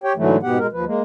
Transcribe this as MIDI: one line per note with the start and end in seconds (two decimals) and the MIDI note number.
0.04 0.13 67
0.04 0.13 73
0.04 0.13 79
0.17 0.37 44
0.17 0.37 50
0.17 0.37 52
0.17 0.37 54
0.17 0.37 57
0.43 0.58 44
0.43 0.58 47
0.43 0.58 59
0.43 0.58 67
0.43 0.58 78
0.58 0.67 47
0.58 0.67 56
0.58 0.67 70
0.72 0.85 39
0.72 0.85 53
0.72 0.85 71
0.85 1.02 56
0.85 1.02 58